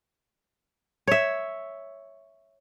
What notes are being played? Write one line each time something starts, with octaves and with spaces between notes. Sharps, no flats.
C#5 E5